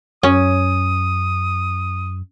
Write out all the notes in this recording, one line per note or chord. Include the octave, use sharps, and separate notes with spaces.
F#2 C#4 D#6